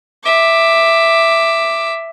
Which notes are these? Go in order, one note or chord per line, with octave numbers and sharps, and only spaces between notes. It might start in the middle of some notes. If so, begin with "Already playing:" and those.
E5 D6